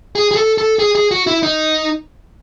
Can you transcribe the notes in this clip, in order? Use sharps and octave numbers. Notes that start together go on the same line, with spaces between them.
G#4
G#4
A4
A4
G#4
G#4
F#4
E4
D#4